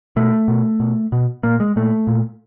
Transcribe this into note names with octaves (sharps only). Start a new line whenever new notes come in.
B2 A3
B2
B2
B2
A#2 A#3
G#3
A#2 A3
A#2